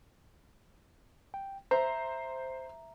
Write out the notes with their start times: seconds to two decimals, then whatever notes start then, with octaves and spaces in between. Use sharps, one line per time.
1.34 G5
1.71 C5 E5 A#5